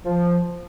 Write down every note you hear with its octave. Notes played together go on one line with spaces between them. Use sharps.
F3